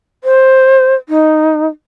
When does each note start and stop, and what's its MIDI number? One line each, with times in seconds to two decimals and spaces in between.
0.24 0.95 72
1.09 1.67 63